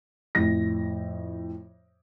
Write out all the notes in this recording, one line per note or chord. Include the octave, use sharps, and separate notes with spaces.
F2 A2 A#6